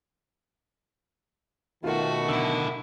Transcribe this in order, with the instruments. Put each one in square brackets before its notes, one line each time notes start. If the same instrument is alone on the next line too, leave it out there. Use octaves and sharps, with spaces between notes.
[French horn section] B2 D#3 [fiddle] A3 F#4 [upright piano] F4 A#4
[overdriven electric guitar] D3 E4 [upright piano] E6